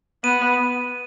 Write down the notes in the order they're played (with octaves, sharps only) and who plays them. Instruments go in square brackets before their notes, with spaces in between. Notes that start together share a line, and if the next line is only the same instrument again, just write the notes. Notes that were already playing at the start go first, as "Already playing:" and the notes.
[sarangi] B3 [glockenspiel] D#7